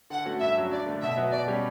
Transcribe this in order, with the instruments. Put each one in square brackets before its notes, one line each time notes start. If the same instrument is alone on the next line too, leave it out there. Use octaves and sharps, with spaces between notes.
[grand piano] D3 [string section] F#5
[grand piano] A3 C#4 F#4
[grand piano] G2 [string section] E5
[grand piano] F#3 C#4
[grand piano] G2 [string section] D5
[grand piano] D3 A3
[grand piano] B2 [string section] E5
[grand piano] F#3 B3
[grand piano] B2 [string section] D5
[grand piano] G3 C#4 G4